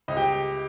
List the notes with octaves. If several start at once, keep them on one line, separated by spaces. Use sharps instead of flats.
C#2 D#5
G4 G5